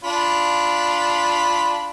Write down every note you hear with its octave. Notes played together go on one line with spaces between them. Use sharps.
D4 F4 B5